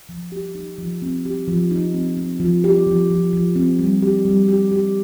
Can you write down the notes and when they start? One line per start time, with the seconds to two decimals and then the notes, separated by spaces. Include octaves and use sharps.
0.09 F3
0.32 G4
0.55 D#4
0.79 F3
1.02 C4
1.25 G4
1.48 F3
1.71 D#4
1.94 C4
2.17 C4
2.40 F3
2.64 G4
2.87 F3
3.10 F3
3.33 F3
3.56 C4
3.79 G3
4.02 G4
4.25 G3
4.48 G4
4.72 G4